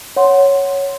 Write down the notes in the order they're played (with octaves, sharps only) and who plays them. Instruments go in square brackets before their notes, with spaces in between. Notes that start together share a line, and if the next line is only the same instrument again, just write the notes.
[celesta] C#5 F#5 C6